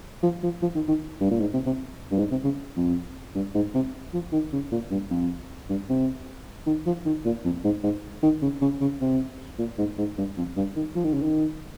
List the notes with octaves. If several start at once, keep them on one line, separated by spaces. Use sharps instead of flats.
F3
F3
F3
D#3
D#3
G2
A#2
G#2
C3
C3
G2
G#2
C3
C#3
F2
G2
G#2
C3
F3
D#3
C#3
A#2
G2
F2
G2
C3
D#3
F3
D#3
A#2
F2
G#2
G#2
D#3
C#3
C#3
C#3
C3
A#2
G#2
G#2
G2
F2
G2
D#3
F3
D#3
C#3
D#3